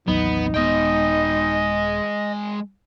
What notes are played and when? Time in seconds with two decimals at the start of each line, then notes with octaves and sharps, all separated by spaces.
0.08 A1 D#2 F#3 B3 D#4
0.54 D#1 G#3 B3 D#5 G5